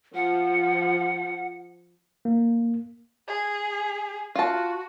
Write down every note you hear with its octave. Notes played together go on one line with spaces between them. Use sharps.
F3 F#5
A#3
G#4
F4 F#4 A5